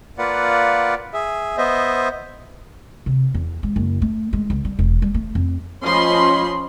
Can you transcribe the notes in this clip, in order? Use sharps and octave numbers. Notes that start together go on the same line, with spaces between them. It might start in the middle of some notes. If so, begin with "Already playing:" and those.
A#3 F4 B4 D5 F#5
G#4 E5
B3 C5 D#5 E5
C3
E2
G#3
F#1
A3
G#3
C#2
G3
E1
G3
A3
F2
F3 C#4 D#5 B5 C6